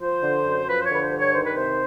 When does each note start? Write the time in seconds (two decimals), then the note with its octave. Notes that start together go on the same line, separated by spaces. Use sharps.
0.01 F3 C5
0.23 D3
0.46 F#2
0.67 F3 B4
0.80 C5
0.84 D3 C#5
0.95 B4
1.00 C5
1.11 G2
1.17 C#5
1.33 D#3 C5
1.44 B4
1.54 C3 C5